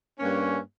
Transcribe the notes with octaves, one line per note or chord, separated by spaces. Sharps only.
G2 G3 A#3 C#4